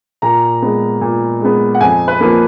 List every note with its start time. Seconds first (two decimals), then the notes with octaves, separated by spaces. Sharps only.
0.22 A#2 A#5
0.62 G#3 B3
1.01 A#2
1.41 G#3 B3
1.75 F#5
1.81 F2 G#5
2.08 B4
2.20 F3 A#3